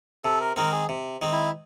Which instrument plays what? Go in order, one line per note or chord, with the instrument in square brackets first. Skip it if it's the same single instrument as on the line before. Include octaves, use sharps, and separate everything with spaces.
[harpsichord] C3 [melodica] A4
[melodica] A#4
[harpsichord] D#3 G#3 C4 [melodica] A#4
[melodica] G#4
[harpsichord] C3
D#3 G#3 C4
[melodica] E4